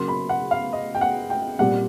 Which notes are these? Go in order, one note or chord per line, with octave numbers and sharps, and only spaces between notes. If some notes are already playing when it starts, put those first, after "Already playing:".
Already playing: C#3 F#3 A#3 C6
B5
F#5
F5
D#5
G5
F#5
G5
A#2 G3 C4 F#5